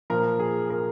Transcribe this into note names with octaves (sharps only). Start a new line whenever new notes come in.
A#2 F3 A#4
G#4
A#4